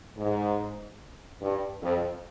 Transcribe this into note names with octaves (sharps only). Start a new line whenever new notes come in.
G#2
G2
F2